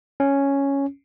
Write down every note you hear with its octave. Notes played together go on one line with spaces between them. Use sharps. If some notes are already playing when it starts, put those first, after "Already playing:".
C#4